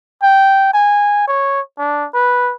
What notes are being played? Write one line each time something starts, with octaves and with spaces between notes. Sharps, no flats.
G5
G#5
C#5
D4
B4